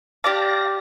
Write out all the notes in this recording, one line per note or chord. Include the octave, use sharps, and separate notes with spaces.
G4 D5 F5 A5 D6 A#6